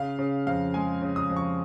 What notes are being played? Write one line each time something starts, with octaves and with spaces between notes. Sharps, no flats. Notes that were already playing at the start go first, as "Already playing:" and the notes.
Already playing: C#3 F5
C#3
F2 F5
G#3 G#5
C#3
D#6
F2
C#6